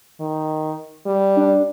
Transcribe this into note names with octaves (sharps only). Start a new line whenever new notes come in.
D#3
G3
D4